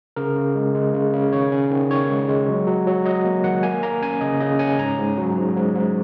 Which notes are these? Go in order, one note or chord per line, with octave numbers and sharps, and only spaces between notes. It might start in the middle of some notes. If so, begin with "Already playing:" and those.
C#3 A#4
C#3
G#3
G#3
C#3
C#3
D#3 C#5
C#4
D#3
D#3 C#5
G#3
G#3
F#3
F#3
F#3
F#3 D#5
A#3
D#3 F#5
A#3 G#5
A#3 A#5
C#4 G#5
C#3 D#5
C#3 D#5
C#4 G#5
G#2 A#5
G#2
F#3
G#2
G#2
G#2